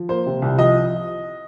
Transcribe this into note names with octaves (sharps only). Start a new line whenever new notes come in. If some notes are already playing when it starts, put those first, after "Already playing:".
Already playing: F3
A#3 C5
C3
C2
F3 D#5